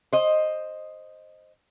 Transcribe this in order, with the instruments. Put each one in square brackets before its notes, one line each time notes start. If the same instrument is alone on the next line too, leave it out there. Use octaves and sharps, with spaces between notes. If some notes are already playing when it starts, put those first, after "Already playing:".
[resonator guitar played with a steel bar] C5 D#5